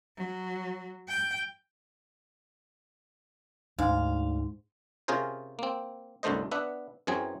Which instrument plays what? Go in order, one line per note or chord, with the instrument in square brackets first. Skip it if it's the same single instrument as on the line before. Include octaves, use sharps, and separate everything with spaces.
[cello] F#3
G5
[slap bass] D2 [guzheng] G#2 [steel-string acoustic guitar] F5
[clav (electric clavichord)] C3 C#4 F4 G#4 A#4 C5
A#3 C4
C2 F#2 D3 A3 C5 D#5
B3 D4 E5 F#5
F#2 E3 F#3 C4 G#4 G#5